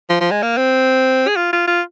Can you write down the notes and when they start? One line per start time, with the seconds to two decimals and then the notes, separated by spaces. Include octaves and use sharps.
0.10 F3
0.21 F3
0.31 G#3
0.43 A#3
0.57 C4
1.28 G#4
1.36 F4
1.53 F4
1.68 F4